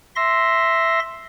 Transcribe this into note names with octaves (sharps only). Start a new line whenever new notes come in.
E5 C6 A#6